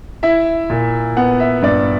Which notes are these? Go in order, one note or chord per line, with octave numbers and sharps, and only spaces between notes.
E4 E5
A#2
B3 F#5
E5
G2 D5